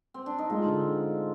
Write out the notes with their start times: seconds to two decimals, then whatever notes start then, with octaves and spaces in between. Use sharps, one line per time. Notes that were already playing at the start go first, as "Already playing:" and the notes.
0.14 C4
0.26 D4
0.38 D#4
0.50 G#3 F4
0.66 D3